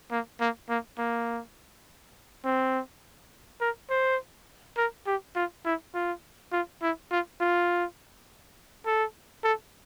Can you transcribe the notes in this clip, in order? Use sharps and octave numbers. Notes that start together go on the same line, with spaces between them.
A#3
A#3
A#3
A#3
C4
A#4
C5
A#4
G4
F4
E4
F4
F4
E4
F4
F4
A4
A4